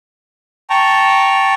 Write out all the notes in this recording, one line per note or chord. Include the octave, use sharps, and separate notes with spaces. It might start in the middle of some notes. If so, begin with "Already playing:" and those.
G5 A5 A#5 C#6